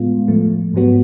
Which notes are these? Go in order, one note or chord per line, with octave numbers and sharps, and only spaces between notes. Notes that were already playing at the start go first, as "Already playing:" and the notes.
Already playing: A2 G#3 B3 F4
A2 F3 A3
G#2 F#3 B3 F#4